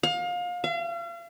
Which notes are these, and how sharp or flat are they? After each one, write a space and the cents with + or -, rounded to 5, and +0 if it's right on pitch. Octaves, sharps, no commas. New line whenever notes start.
F5 +30
F5 -40